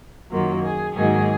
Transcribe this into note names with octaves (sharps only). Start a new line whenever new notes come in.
F#2 D#3 F#3 A#3 F4
G#4
G#2 D#3 F#3 A#3 G#4